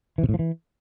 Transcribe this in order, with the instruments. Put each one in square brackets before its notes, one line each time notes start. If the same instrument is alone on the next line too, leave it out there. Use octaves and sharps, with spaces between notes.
[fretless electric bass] E3
C3
A2
F3
E3